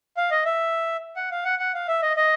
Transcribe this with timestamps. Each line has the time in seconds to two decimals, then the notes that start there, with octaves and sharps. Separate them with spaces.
0.17 F5
0.31 D#5
0.45 E5
1.16 F#5
1.31 F5
1.44 F#5
1.59 F#5
1.74 F5
1.88 E5
2.02 D#5
2.17 D#5